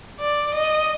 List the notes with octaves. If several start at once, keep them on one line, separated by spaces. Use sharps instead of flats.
D5
D#5